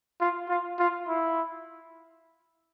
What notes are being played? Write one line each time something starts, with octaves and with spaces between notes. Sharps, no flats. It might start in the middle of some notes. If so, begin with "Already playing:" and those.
F4
F4
F4
E4